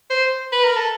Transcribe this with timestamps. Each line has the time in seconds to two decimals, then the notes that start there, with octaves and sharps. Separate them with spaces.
0.10 C5
0.52 B4
0.64 A#4
0.76 A4